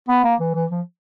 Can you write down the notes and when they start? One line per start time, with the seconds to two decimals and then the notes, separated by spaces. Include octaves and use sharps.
0.08 B3
0.24 A#3
0.40 E3
0.55 E3
0.71 F3